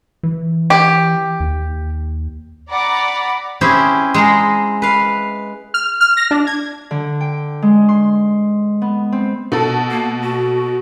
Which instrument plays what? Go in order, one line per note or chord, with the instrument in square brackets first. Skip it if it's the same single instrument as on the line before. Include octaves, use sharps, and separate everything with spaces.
[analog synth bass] E3
[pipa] G4
[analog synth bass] D#2
[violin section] D5 F#5 A#5 B5 D6
[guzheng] C4 C#4 E4 G4 G#4
G#3 A#5 C6
B4 F5
[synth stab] F6
F6
A#6
D4
G#6
[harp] D3
G5
G#3
C6
B3
C4
[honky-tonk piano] B2 A4
[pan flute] A#3
F#4